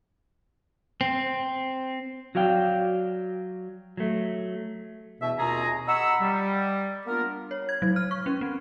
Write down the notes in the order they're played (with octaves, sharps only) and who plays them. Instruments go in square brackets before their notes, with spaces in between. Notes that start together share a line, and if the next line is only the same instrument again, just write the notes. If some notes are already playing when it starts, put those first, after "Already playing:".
[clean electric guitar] C4
[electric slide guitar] F#3 F#4 D5 F5 G5
F#3 A3
[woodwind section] E2 B2 B3 D4 E5
D#2 B2 C4 F4 G#4 A#5
D#5 F#5 A#5 B5 C#6 E6
G3
A#3 B3 D4 F4 A#4
[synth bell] C#5
G#6
F#3
F6
C#6
C#4
C4